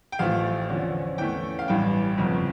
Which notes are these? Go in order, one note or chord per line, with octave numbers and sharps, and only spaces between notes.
G5
A1 A2 F3 A3 F5
E2 D3 F3 C#4
E2 E3 A3 C#4 G5
F5
A1 G2 E3 G5
G1 F2 C#3